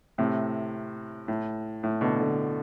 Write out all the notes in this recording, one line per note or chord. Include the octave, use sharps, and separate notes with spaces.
A2 C3
A2
A2
B2 D3
B2 D3